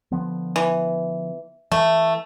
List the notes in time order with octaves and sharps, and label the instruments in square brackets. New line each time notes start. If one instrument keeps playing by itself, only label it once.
[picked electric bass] D3 F3 B3
[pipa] E3
[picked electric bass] E3 [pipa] A3